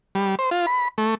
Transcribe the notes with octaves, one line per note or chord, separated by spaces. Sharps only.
G3
C5
F4
B5
A3